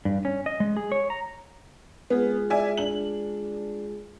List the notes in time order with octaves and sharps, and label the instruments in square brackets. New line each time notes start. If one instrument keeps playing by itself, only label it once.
[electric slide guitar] G2
C#4
D#5
G#3
G#4
C#5
A#5
[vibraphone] G#3 F4 G#4 [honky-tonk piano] B3
[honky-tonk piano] D5 E5 G#5
D4 F#7